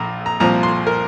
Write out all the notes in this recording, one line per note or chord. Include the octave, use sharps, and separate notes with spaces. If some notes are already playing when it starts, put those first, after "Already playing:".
Already playing: A#1 A#2 A#5
A#5
C2 A#2 F3 A#5
C6
A#4